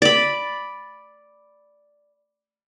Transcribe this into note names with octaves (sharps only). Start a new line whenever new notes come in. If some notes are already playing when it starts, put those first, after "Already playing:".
D5 B5